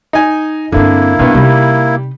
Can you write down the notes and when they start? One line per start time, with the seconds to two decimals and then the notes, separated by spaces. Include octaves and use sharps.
0.13 D#4 G#5
0.72 G2 D3 A#3 C4 E4
1.19 G2 B2 B3 F4
1.35 C3 G3 D#4